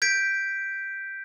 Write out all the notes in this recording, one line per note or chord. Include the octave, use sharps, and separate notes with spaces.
G6 G#6 B6 D7